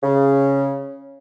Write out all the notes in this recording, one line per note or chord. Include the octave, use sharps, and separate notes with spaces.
C#3